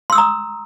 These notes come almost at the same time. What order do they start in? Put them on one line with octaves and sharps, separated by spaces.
C6 E6 D#6 A#5